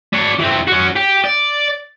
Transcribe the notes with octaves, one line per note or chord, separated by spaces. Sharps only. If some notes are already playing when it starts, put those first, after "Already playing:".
D4 C#5
E3 C4
C#4 F#4
G4
D5